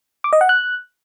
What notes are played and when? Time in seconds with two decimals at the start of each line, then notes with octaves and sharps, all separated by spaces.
0.24 D6
0.33 D#5
0.41 F#5
0.49 F#6